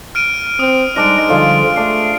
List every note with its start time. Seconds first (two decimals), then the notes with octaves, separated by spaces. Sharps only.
0.15 F6 D7 D#7
0.59 C4 D#6
0.96 G3 G#3 D4 D#4 C5 D#5 F6 D7
1.30 D3 F3 G3 F4 G#4 F5
1.77 A3 D4 F5